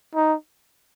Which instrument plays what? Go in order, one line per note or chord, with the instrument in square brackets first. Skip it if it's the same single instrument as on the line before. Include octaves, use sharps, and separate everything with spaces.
[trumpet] D#4